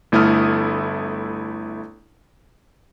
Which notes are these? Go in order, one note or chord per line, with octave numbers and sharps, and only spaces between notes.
G1 A3 E4 A4 D#6 F6